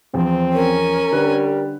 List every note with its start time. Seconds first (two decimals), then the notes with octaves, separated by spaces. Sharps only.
0.14 E2 F3 C4
0.54 C#4 A#4 G#5
1.12 D3 G3 B4 F#6